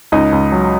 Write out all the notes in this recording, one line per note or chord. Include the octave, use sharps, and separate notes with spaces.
C#2 D#4 D#5
C#2
F#3